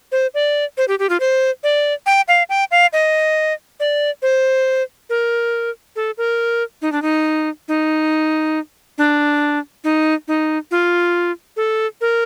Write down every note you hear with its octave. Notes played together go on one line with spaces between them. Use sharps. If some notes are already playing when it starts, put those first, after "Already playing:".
C5
D5
C5
G4
G4
F4
C5
D5
G5
F5
G5
F5
D#5
D5
C5
A#4
A4
A#4
D#4
D4
D#4
D#4
D4
D#4
D#4
F4
A4
A#4